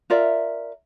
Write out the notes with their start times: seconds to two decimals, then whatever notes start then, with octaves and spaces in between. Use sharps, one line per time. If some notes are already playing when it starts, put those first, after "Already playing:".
0.10 F4 A#4 D5 E5